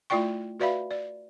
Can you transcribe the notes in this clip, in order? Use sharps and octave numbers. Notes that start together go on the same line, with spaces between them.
A3 E4 F4 D5 G5 C#6
F#4 B4 D5 E5 F5 B5
D5